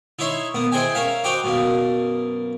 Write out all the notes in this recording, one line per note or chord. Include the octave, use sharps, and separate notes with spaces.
D#4 E4 C#5 E5 C6
A#3 B3
E4 G#4 C5 D#5 G5 G#5
C#4 A#4 E5 F5
F#4 C5 D#5 G5 A#5 D6
F#2 B2 A#3